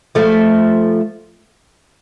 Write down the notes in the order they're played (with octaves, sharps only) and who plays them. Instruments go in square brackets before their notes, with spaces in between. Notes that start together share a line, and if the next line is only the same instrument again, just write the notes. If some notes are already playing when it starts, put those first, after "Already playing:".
[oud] F3 A3